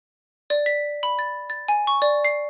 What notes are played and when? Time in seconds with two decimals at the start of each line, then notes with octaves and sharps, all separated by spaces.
0.50 D5
0.66 B6
1.03 B5
1.19 A6
1.50 A6
1.68 G#5
1.87 C#6
2.02 D5
2.25 C7